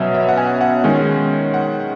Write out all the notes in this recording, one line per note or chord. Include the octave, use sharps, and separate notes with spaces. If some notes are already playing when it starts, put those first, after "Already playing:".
Already playing: B2 F#3 C#4 E5
E5
F#5
G#5
F#5
D#3 G#3 C#4
F#5